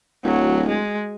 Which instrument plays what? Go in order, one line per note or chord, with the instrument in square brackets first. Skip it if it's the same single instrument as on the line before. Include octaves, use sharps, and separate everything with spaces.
[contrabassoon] D1 [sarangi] F#3
[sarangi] G#3